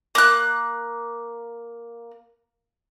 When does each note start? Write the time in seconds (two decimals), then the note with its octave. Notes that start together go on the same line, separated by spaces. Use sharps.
0.15 A#3 F#6